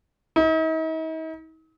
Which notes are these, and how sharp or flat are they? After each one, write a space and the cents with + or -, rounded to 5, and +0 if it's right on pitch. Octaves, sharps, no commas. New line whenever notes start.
D#4 +45